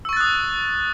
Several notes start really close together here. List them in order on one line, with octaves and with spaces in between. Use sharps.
E6 C#6 A6 F#6 D#6